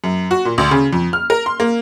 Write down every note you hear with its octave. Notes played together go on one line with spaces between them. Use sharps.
F#2
F#4
A#2
D2
C#3
F2
F6
A#4
C6
A#3